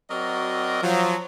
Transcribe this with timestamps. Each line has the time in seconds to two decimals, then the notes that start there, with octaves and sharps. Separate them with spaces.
0.11 F#3 C4 F#4 A#4 D5 D#5
0.83 F3 F#3